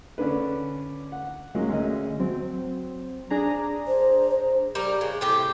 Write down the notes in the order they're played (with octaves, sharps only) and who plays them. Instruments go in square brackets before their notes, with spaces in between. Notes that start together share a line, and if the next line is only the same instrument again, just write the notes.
[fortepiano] D3 C#4 D4 B4
F#5
F#3 G#3 A#3 C#4
D2 G#3 C#4 D#5
[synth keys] F#3 C4
D4 G#4 A#5
[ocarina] C5
[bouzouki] G3 A#4 A#5
C#3 G#3
A2 C3 G4